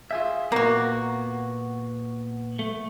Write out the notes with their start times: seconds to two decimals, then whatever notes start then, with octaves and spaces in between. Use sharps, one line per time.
0.11 F4 G#4 E5
0.52 A#2 A#3 B3 F#4
2.59 A3